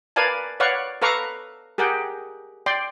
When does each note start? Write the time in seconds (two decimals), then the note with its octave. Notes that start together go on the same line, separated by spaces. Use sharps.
0.16 A#4 B4 D5 F5 G#5 A5
0.60 B4 C#5 D5 F5 F#5 C#6
1.02 A4 B4 F5 A#5 C#6 D6
1.78 G4 G#4 A#4 F#5 G5
2.66 D5 G5 C6